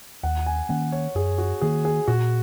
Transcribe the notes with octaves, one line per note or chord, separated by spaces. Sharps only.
D#2 F#5
G#5
D#3 A#3 C#4 F#5
C#5
F#2 G#4
F#4
D#3 A#3 G#4
G#4
A#2 F#4